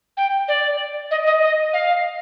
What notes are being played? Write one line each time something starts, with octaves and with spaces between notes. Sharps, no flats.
G5
D5
D#5
D#5
D#5
F5